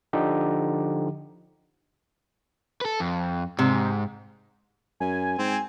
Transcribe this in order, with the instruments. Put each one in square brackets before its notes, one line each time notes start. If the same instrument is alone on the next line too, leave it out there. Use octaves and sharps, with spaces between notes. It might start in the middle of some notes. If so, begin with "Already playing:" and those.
[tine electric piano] D3 F3 D#4 G4
[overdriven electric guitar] A4 B4
F2
[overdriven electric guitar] G#2 [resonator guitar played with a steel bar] C3
[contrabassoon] F#2 [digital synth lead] G#5
[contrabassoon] G#2 [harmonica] C4